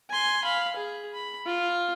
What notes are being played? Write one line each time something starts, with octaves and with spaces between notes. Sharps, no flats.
G#5 C6
F5 B5
G#4
B5
F4